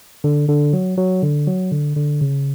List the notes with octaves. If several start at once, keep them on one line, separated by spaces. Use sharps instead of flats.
D3
D3
F#3
F#3
D3
F#3
D3
D3
C#3